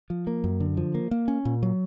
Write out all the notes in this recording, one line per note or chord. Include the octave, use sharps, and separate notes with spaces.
F3
A#3
F#2
D3
F3
A#3
A#3
C#4
A#2
F#3